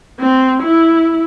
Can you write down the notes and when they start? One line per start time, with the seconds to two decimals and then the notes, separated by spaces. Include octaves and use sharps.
0.20 C4
0.62 E4